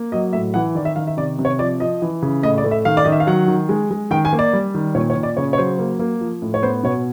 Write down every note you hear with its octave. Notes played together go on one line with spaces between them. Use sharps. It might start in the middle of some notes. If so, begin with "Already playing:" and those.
Already playing: A#3
F#3 D#5
A2 E5
E3 F#5
D#3 D5
E5
D#3 F5
E5
C3 D5
C3
C#5
F3 D5
F3 D#5
E3
C#3
A2 D#5
D5
A3
E5
D#3 F5
D5
D#3 D#5
E5
F5
F#3 F#5
D#3
G#3
G#3
D#3 G5
G#5
A#3
D5
G3
D#3
A#2 C#5
C#5
A#2
D5
C#3 C#5
C#5
F#3 C5
A#3
A#3
F3
A2
C#5
B3 C5
B2 C#5